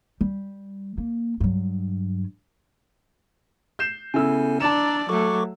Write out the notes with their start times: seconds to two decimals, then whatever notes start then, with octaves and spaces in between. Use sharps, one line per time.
0.21 G3
0.98 A#3
1.40 G2 F#3
3.79 G6 C7 E7
4.14 C#3 B3 E4 A4 G#5 E6
4.60 D4 D5 A5 A#5 E7
5.09 F#3 A3 A4 C#6 D6